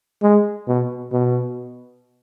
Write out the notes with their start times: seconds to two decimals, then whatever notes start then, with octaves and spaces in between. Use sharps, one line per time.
0.22 G#3
0.68 B2
1.12 B2